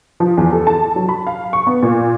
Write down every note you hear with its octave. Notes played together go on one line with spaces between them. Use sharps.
F3
E2
A4
A5
F#3
B5
F5
C#6
B3
A#2